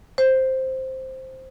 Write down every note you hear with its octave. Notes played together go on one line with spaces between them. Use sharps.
C5